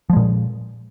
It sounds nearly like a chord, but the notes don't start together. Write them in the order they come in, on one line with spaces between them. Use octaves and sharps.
F3 G#3 A#2